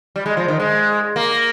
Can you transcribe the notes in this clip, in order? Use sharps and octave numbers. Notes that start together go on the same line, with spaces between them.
G3
G#3
F3
D#3
G#3
A#3